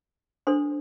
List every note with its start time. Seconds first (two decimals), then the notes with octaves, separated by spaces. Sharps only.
0.47 D4 A4 C5 C6